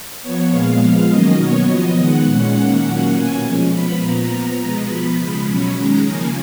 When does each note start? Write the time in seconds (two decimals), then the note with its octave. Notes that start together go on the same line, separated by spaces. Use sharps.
0.22 F3 B3 C#5
0.51 A#2 G#3 B3 F5
0.81 F3 G#3 B3
1.09 D#3 F#3 A#3 C#4 D#5
1.39 B2 F#3 B3 C#5
1.67 F3 B3 D#5
1.97 D#3 G#3 B3 F#5
2.26 A#2 G#3 C#4
2.56 D#3 A#3 C#4
2.84 A#2 F#3 A#3 C#4 F#5
3.13 B2 A#3 C#4 G#5
3.43 F3 G#3 C#4
3.72 F3 B3 B5
4.01 A#2 F3 B3 A#5
4.31 F3 B3
4.60 B2 G#3 B3 A#5
4.89 F3 B3 B5
5.18 C#3 F3 G#3 B5
5.47 B2 F#3 C#4 B5
5.77 D#3 G#3 C#4 A#5
6.06 C#3 F3 A#3 G#5